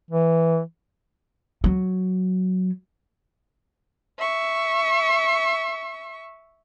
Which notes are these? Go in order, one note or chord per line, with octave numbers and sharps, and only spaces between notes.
E3
F#3
E5 C#6